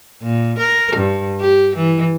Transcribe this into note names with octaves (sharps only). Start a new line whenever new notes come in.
A#2
A#4
G2
G4
E3